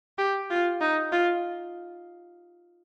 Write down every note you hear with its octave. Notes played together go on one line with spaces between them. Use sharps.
G4
F4
D#4
F4